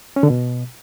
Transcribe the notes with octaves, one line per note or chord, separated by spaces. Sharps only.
C#4
D3
B2